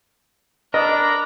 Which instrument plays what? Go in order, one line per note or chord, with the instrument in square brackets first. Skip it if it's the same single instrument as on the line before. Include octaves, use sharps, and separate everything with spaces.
[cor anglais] D4 [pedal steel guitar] A#4 [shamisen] D#5 [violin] A#5 B5